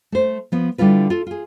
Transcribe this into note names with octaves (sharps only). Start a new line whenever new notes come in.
A3 C5
F3 B3
D3 G3 E4 F4 B4
F4 A4
F4 G#4